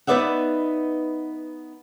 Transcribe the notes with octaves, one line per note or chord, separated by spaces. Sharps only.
B3 D#4 B4 D5 E5 F#5